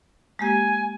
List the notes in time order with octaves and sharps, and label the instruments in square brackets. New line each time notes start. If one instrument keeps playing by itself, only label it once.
[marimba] G#3 A#3 G4 [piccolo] G#5